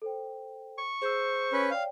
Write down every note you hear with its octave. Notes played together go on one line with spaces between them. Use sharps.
A4 C5 G5
C#6
G#4 C5 E6
C#4 B4
C#5 D5 F5 G5